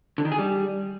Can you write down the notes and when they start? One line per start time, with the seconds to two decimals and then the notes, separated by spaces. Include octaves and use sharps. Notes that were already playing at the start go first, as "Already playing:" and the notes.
0.18 D3
0.25 D#3
0.32 G#4
0.38 G3